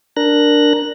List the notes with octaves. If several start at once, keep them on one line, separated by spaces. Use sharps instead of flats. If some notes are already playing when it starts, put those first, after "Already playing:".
D4 A#4 F#6 A#6